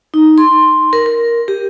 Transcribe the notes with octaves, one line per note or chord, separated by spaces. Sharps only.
D#4
C6
A#4
A#4
G4